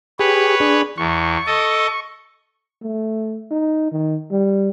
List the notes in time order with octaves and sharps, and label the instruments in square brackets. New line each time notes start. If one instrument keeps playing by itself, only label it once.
[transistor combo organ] G4 G#4 [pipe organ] B4 C#5
[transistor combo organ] D4 G#4
[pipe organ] E2 [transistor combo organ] C#6
[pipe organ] A4 D#5
[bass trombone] A3
D#4
D#3
G3